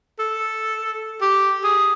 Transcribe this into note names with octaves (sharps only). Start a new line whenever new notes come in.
A4
G4
G#4